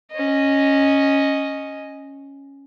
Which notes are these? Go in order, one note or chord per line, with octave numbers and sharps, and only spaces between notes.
C#4 D#5